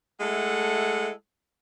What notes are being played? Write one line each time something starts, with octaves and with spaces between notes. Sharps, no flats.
G#3 A3 E4 A4 F#5